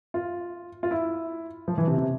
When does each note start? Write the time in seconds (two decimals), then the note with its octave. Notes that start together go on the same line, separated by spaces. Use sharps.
0.14 F4
0.83 F4
0.91 E4
1.68 F3
1.78 E3
1.88 C3
1.98 C3